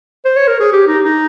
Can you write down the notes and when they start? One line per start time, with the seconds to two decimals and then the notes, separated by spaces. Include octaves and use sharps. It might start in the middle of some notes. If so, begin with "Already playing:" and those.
0.25 C5
0.37 C#5
0.48 A#4
0.60 G#4
0.73 G4
0.88 D#4
1.04 D#4